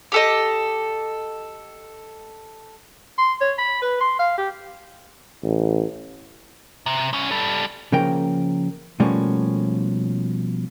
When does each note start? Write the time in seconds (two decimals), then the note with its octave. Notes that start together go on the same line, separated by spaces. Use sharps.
0.12 G4 A4 D#5
3.18 C6
3.41 C#5
3.58 B5
3.82 B4
4.01 C6
4.19 F5
4.38 G4
5.43 A1
6.86 C3
7.13 C2 C#4
7.31 G3 A4
7.92 C#3 F3 A#3 A#4 G5
9.00 B2 F3 G3 A3 A#3 C#4